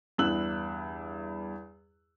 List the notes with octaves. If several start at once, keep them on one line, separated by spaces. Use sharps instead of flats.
E2 G2 E4 E6 F#6 F#7